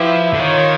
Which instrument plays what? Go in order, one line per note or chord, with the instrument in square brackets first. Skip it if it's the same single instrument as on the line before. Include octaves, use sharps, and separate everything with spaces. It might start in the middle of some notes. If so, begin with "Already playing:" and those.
Already playing: [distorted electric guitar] F3 [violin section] E4 G4 B4 E5
[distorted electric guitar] D3
[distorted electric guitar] D#3 [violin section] F4 A#4 C#5